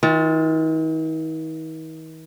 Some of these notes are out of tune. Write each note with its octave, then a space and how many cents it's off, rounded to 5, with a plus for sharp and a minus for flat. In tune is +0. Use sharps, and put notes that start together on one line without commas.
D#3 +45 F4 +0